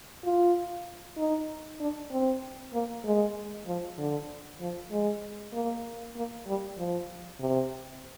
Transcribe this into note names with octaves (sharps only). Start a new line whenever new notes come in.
F4
D#4
D4
C4
A#3
G#3
F3
D3
F3
G#3
A#3
A#3
G3
F3
C3